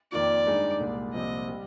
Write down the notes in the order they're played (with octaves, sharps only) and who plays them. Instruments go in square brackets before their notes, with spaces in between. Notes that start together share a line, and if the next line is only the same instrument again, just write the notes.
[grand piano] F2 D#3 A#3 F4 [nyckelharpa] D5
[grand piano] G2 D#3 G#3 D#4 G#4
C2 A#2 G#3
[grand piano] C2 A#2 F3 C4 G4 [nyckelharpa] D#5
[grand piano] G3